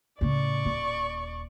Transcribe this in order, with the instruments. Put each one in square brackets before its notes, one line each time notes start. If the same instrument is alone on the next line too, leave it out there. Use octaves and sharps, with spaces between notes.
[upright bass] A2 C#3 [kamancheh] D5 C#6
[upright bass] D#1